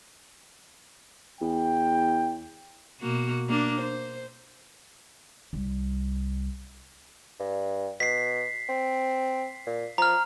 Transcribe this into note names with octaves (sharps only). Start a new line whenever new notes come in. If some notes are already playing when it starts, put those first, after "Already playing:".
E2 G5
B2 A#3 F#4
A#3 D4
C5
C2 G3
G2
B2 B6 C7
C4
A#2
F3 A#5 F6